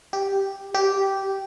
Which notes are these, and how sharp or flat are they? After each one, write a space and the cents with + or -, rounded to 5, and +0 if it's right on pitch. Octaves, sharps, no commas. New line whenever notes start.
G4 -5
G4 -10